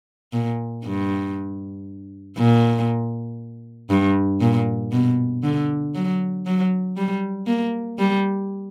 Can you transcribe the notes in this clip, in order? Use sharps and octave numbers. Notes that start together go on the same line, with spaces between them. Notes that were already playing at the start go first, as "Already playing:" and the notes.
A#2
G2
A#2
G2
A#2
B2
D3
F#3
F#3
G3
A#3
G3